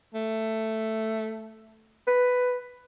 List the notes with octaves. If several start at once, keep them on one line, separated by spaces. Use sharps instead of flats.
A3
B4